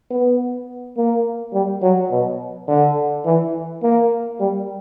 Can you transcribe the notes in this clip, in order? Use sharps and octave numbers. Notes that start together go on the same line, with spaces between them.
B3
A#3
G3
F#3
B2
D3
E3
A#3
G3